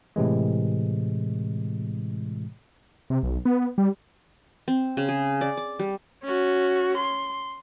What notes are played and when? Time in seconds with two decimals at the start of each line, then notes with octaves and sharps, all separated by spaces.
0.16 A2 C3 E3 G#3
3.10 C3
3.23 B1
3.45 B3
3.78 G3
4.68 C4
4.97 C#3
5.09 G#4
5.41 D5
5.57 D6
5.79 G3
6.24 C#4 F#4
6.98 C6